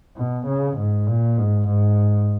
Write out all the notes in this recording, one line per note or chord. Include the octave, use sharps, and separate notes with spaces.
B2
C#3
G#2
A#2
G#2
G#2